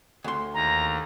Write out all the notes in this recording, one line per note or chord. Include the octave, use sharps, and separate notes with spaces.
D2 C6
D#2 A#5